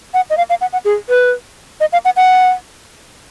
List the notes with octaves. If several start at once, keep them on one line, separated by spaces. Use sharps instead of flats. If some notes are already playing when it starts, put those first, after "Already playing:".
F#5
D#5
F5
F5
F#5
F#5
G#4
B4
D#5
F5
F#5
F#5